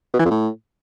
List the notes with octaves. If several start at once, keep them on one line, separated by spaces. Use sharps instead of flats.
B2
E3
F2
A2